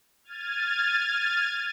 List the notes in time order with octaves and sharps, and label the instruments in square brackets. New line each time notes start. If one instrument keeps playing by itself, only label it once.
[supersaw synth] F6 G#6 A6 D#7